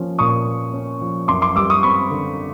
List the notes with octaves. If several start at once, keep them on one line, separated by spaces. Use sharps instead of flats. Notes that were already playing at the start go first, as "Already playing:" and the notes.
Already playing: F3 A#3 C#4
A#2 C#6 D#6
A#3
C#4
F3
F#2 C6 D6
C6 D6
G3 D6 E6
C#6 D#6
C4 B5 C#6
D3